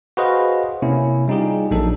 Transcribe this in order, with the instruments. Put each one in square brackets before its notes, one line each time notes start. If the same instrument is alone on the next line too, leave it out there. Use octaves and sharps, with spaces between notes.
[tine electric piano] F#4 G#4 B4 C5 D#5 F5
C3 A#3 C#4 E4
G3 D#4 F4 G4 G#4
A#1 F#3 A#3 D4 D#4 A4